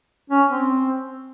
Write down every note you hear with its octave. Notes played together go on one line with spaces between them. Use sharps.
C#4
C4